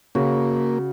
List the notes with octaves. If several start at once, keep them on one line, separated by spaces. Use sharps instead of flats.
C#3 A#3 F#4